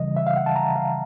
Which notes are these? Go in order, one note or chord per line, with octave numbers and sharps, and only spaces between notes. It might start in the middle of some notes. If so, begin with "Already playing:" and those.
Already playing: C#3 E3 G3 D#5
E5
F5
F#5
A5
A#5
F5